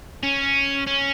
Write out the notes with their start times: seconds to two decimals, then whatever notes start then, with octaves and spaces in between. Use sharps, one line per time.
0.23 C#4
0.87 C#4